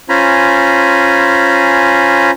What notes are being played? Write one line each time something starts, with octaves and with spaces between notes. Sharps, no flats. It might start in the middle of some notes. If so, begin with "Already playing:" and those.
C#4 F4 C5 G#5 A#5 B5